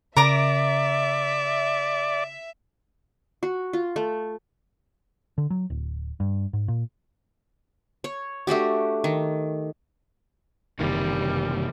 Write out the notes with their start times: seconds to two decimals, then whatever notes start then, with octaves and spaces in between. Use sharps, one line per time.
0.17 C#3 A#4 D5 E5 A#5 D6
3.43 F#4
3.73 F4
3.96 A3
5.38 D3
5.50 F#3
5.70 D1
6.20 G2
6.53 G#2
6.68 A#2
8.04 C#5
8.47 A3 D4 F#4 G4
9.04 D#3
10.79 F#1 C3 D#3 E3 G3 A#3